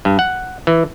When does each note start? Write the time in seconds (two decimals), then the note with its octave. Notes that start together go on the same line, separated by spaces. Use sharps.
0.05 G2
0.19 F#5
0.67 E3